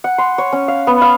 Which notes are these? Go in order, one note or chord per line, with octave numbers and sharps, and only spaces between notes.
F#5
C6
C#5
C#4
F5
B3
F5